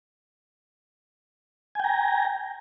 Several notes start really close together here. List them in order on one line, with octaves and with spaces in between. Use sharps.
G#5 G5 A#5